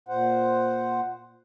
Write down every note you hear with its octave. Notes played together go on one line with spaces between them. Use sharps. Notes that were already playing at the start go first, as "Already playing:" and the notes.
A#2 C5 F#5